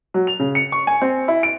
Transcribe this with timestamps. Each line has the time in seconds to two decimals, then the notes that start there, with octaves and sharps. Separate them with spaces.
0.14 F#3
0.27 F7
0.40 C#3
0.55 C#7
0.72 C#6
0.87 G#5
1.02 C4
1.28 E4
1.43 D7